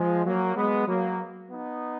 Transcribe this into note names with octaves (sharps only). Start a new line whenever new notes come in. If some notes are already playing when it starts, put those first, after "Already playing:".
Already playing: F3 G#3
F#3 A#3
G#3 B3
F#3 A#3
B3 D#4